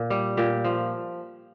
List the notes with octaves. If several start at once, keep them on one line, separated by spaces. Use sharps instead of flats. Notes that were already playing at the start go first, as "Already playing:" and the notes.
Already playing: A#2
G3
A#2 G4
F3